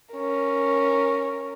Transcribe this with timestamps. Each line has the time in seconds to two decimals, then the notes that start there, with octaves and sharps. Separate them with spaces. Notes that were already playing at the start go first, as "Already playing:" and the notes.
0.14 C#4 A#4